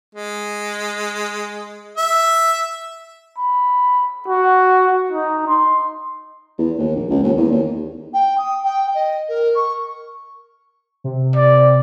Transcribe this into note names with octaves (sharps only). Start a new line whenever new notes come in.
G#3
E5
B5
F#4
D#4
C6
E2
D#2
A#1
C#2
D#2
E2
D#2
G5
D#6
G5
D#5
A#4
C#6
C3
D5